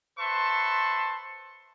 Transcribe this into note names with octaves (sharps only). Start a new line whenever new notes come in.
B4 C5 E5 A5 C6 C#6